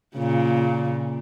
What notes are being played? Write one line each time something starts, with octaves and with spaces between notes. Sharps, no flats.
A#2 C#3